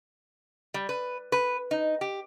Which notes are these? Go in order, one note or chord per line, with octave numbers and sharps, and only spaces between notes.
G3
B4
B4
D#4
G4